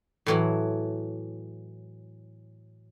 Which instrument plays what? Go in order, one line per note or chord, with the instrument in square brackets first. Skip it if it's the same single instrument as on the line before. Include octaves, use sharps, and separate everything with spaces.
[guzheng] A2 E3 F#3